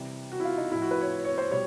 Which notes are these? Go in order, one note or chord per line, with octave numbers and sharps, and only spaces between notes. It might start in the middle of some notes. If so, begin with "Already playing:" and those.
Already playing: C3 E3 G3
F#4
E4
F4
D#4
A2 F3 E4
F#4
B4
C#5
C#5
C5
B2 G3 C#5